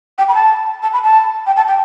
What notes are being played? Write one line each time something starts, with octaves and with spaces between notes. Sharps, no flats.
G5
B5
A5
A5
B5
A5
G5
A5
G5